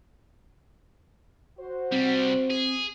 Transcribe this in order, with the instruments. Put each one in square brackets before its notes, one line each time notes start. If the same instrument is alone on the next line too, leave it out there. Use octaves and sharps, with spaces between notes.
[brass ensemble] F#4 C5
[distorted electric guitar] C3 G3 [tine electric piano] C4
[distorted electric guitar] G#4